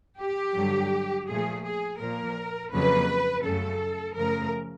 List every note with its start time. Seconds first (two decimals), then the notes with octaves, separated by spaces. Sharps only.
0.20 G4
0.56 G2 D3 F#3
1.28 A#2 F3 A3 G#4
1.64 G#4
2.00 A#2 F3 A#3 A#4
2.72 F2 C#3 F#3 A#3 B4
3.44 F#2 C#3 F#3 A3 A4
4.16 F#2 C#3 F3 A3 A#4